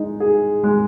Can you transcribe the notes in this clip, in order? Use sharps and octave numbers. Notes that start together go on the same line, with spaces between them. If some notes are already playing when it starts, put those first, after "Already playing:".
Already playing: G#3 D#4
G#4
G#3